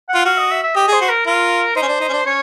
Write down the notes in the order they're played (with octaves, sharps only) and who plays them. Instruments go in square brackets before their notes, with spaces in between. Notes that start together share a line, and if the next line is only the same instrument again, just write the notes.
[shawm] F#5
[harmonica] F4
[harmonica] F#4 [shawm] F5
[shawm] D#5
E5
E5
[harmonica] G4 [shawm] D#5
[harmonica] G#4
[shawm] C5
[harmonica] F#4
[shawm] A#4
[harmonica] F4 [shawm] A#4
[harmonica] D#4 [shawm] C5
[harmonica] C#4
D4
D#4
C#4
D4
[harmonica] C#4 [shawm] C#5